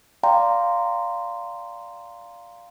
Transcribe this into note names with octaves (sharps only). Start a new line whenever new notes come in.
D5 F5 G5 A#5 C6